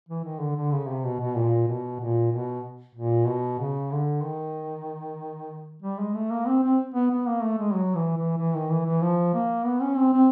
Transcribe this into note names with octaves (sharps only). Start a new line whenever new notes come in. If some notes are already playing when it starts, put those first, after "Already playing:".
E3
D#3
D3
D3
C#3
C3
B2
B2
A#2
B2
A#2
B2
A#2
B2
C#3
D3
D#3
G3
G#3
A3
A#3
C4
C4
B3
B3
A#3
A3
G#3
F#3
E3
E3
E3
D#3
E3
E3
F3
A#3
B3
C#4
C4
C4